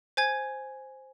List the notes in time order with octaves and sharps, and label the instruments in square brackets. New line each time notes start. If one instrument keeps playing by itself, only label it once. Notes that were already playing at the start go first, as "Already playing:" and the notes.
[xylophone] C5 G#5 G#6